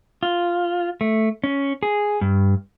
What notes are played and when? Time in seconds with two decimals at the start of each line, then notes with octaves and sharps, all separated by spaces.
0.23 F4
1.01 A3
1.44 C#4
1.83 G#4
2.21 G2